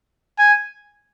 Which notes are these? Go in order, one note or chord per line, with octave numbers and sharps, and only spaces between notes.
G#5